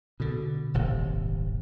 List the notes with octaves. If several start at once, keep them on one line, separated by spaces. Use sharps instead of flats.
B2 D3
D#1 G#1 C3